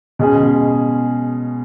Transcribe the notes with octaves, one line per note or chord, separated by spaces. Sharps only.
B2 G#3 C#4 G#4